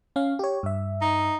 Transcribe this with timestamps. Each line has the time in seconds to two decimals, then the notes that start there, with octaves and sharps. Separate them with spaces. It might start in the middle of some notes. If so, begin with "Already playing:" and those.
0.16 C#4 F5
0.39 G4 C#5
0.63 G2 E5
1.01 D#4